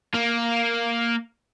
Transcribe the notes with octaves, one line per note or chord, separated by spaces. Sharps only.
A#3